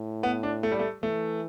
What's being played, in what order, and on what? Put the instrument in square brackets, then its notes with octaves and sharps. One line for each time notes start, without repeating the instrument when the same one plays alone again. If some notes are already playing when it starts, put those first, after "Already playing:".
Already playing: [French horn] A2
[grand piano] B3
D4
A3
G3
A3
[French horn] E3 [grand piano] A3